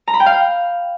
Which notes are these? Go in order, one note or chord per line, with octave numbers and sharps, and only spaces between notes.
A#5
B5
G5
F5